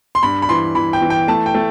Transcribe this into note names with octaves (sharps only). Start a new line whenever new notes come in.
C6
G2 B5
B5
E3 C6
E3 B5
G5
E3
G5
A3 A5
G5
A3